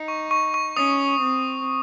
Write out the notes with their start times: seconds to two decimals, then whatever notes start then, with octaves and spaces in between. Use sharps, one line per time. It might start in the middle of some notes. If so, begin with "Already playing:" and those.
Already playing: D#4
0.08 C#6
0.31 C#6
0.54 C#6
0.76 C#4 D#6
1.22 C4